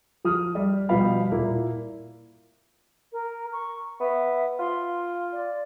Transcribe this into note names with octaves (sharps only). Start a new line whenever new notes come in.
F3 D#6 F6
G3 D5
B2 F3 G3 B4 F5 B5
A#2 A#3 E4
A#4
C#6
B3 E5
F4 C6
D5